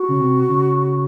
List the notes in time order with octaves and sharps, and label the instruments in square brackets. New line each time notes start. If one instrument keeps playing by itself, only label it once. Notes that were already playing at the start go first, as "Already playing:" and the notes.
Already playing: [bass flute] F#4
[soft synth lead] C#3
C3
C#3